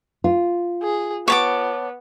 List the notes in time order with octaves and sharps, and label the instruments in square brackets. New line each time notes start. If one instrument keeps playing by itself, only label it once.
[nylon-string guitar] F4
[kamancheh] G#4
[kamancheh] B3 [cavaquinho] C#5 A5 D6